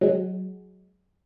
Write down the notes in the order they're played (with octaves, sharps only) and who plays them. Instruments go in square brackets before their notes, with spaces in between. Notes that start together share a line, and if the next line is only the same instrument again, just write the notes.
[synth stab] F#3 G#3